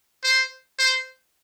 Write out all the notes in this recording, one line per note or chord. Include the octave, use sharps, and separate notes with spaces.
C5
C5